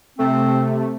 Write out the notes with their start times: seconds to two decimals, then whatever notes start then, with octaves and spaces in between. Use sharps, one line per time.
0.19 C3 A3 C4